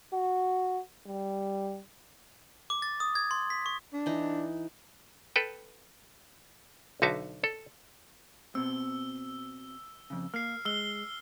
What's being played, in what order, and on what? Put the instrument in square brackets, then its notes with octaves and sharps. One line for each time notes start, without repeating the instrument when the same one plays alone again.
[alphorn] F#4
G3
[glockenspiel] D6
A6
D#6
G#6
C6
B6
C#6
[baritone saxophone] D4
[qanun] E3 D#4
[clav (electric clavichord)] A4 B4 G5
B1 D3 D#4 F#4 E5 A5
A4
[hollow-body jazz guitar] B2 C4 [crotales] E6
[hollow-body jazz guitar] F2 C#3
[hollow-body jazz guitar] A#3 [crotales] F6 C7
[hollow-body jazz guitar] G#3 [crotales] E6 G7